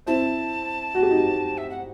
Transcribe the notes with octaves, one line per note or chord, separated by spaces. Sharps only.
C4 E4 A5
F#4
G4
D#4 F#4
E5
F#5